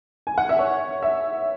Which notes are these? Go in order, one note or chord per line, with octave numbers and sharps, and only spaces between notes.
G#5
F#5
E5
C#5
E5